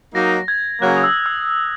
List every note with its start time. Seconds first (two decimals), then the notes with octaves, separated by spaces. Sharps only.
0.15 F#3 A#3 D#4 A#6
0.48 G#6
0.81 C#3 F#3 A#3 F#6
0.97 D#6
1.03 E6
1.26 E6